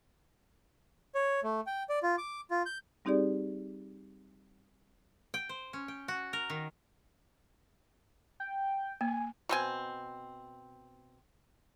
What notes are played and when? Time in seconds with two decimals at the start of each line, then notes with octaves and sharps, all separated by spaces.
1.15 C#5
1.43 A3
1.67 G5
1.89 D5
2.03 F4
2.18 D6
2.51 F4
2.66 G6
3.05 G3 C4 D#4 G4 G#4 D5
5.34 G5
5.49 C5
5.73 C#4
5.88 G5
6.08 F#4
6.33 A#4
6.50 D#3
8.40 G5
9.01 A#3 G#5
9.49 B2 C4 G#5